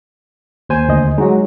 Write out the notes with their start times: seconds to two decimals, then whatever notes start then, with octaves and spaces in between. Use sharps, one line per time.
0.69 D#2 C5 G#5
0.89 D2 D#5
1.18 F#3 G#3 D#4 F#4